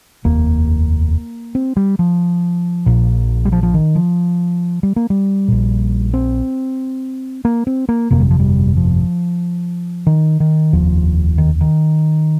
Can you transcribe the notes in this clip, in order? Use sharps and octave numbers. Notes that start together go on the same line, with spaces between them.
F1 D#2 A#3
C4
G3
F3
A#1 A#2
G3
F3
F3
D#3
F3
G3
A#3
G3
A#1 A#2
C4
A#3
C4
A#3
G1 F2 C3 A#3
G3
F3
G3
F3
D#3
D#3
F1 D#2 F3
D#3
D#3